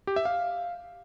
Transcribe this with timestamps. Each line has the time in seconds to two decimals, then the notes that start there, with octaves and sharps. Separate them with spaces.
0.07 G4
0.16 E5
0.25 F5